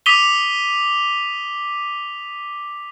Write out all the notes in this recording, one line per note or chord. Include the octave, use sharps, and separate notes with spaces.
D6 D#6 B6 D#7 F7 G7